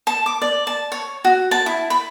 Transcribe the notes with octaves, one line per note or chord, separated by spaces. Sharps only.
A5
D6
D5
A5
C#5
F#4
A5
E4
B5